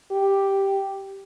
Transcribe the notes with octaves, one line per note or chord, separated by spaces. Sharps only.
G4